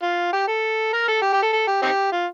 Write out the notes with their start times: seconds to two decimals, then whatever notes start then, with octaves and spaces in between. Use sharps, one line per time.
0.02 F4
0.33 G4
0.47 A4
0.93 A#4
1.08 A4
1.22 G4
1.33 G4
1.43 A4
1.53 A4
1.67 G4
1.82 C4 D#4 G4
2.13 F4